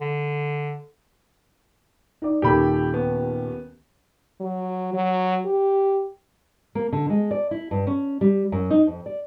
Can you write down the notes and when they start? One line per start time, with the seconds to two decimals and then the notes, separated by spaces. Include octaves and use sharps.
0.01 D3
2.22 D#4 D5
2.42 D#1 D#2 G4 A4 B5
2.94 B3
4.40 F#3
4.93 F#3
5.45 G4
6.75 A#3
6.93 D3
7.10 G#3
7.31 D5
7.51 E4
7.71 G2
7.87 C#4
8.21 G3
8.52 F#2
8.70 D#4
8.87 F2
9.06 D5